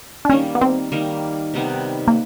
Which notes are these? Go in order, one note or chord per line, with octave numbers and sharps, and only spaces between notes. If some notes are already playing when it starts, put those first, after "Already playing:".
D4
D#3 G3 A#3 C#4
B3
C4
D#3 G3 A#3
C3 D#3 G3 B3
A#3